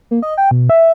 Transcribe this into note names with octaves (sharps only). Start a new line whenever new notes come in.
A#3
D#5
G5
B2
E5